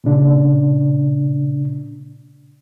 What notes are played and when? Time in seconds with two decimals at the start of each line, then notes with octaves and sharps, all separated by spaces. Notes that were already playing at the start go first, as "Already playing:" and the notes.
0.04 A#2 C#3 D4